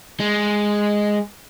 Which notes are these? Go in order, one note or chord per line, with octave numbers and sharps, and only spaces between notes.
G#3